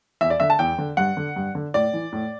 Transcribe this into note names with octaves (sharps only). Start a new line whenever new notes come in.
E2 E5
D5
D3 E5
A5
E2 G5
D3
G2 F#5
D3
G2
D3
A2 D5
E3
A2